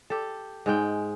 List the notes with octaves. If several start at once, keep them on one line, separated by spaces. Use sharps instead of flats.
G4 A4
G#2 G#3 G5